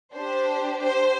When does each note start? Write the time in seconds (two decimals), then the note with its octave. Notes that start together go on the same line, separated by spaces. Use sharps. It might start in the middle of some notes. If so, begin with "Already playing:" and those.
0.14 D4 G4 C5
0.81 C5